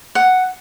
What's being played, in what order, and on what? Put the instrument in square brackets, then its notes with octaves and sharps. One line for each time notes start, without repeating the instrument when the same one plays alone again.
[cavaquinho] F#5